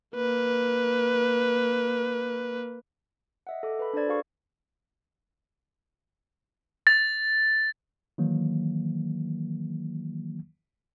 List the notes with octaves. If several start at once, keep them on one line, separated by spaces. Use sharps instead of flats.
A#3 B4
D#5 E5 F#5
A4 D6
B4 A5 B5
D4 A4 B4 C5 D5 G#6
F#4 G#4 F5 C#6
A6
D#3 E3 F#3 A#3